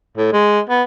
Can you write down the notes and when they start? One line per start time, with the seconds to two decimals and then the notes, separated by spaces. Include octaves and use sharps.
0.17 A2
0.32 G#3
0.69 B3